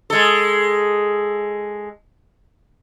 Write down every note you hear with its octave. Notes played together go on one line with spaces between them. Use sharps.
G#3 A4